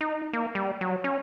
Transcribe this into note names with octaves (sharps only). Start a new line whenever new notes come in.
D#4
A#3
G3
F#3
C#4